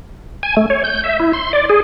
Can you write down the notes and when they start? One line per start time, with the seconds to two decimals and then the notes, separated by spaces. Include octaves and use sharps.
0.43 G#5
0.57 A3
0.70 C#5
0.84 G6
1.04 E5
1.20 E4
1.33 C6
1.53 D5
1.69 G#4